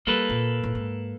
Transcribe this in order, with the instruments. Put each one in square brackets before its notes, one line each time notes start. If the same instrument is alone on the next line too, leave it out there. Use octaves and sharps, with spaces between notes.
[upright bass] G3 [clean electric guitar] A#3 A4 B4
[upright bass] A#2
D1 A2
G#2